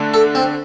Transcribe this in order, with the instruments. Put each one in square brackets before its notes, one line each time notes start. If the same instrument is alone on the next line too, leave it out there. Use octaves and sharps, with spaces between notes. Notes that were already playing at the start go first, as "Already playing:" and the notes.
Already playing: [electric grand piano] D3 A3 D4
[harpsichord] A4
C4